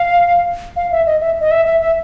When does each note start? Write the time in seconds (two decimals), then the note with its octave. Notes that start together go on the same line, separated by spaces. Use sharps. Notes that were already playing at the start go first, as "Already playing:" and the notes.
Already playing: F5
0.76 F5
0.91 E5
1.06 D#5
1.20 E5
1.40 D#5
1.51 E5
1.66 E5
1.81 E5